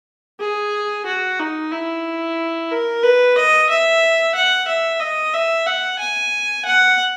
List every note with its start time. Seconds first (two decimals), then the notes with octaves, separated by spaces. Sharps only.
0.40 G#4
1.06 F#4
1.40 D#4
1.72 E4
2.71 A#4
3.03 B4
3.36 D#5
3.69 E5
4.35 F#5
4.68 E5
5.00 D#5
5.33 E5
5.66 F#5
5.99 G#5
6.65 F#5